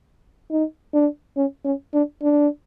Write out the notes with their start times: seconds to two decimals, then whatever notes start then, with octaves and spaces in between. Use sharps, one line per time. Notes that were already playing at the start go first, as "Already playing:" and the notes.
0.51 D#4
0.94 D4
1.37 C#4
1.65 C#4
1.94 D4
2.22 D4